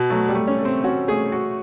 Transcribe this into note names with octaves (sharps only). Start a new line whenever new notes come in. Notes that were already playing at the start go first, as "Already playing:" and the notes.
Already playing: B2
F#3 A3
G3
A3
C#4
A4
C4
C#4 F#4
A3 G#4
F#4